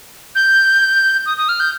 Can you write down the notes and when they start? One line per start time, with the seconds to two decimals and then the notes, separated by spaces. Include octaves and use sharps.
0.35 G6
1.26 D#6
1.38 D#6
1.49 F6
1.60 G6